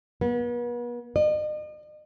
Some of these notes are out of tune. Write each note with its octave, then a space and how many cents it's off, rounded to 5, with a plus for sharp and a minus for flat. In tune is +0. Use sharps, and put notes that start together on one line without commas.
B3 -40
D#5 -40